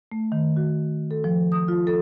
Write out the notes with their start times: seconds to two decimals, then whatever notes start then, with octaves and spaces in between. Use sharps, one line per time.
0.12 A3
0.32 D#3
0.57 F#4
1.11 A4
1.24 F3
1.52 D#6
1.68 F4
1.87 A4